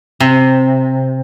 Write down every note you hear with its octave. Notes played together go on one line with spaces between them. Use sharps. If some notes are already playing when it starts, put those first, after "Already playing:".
C3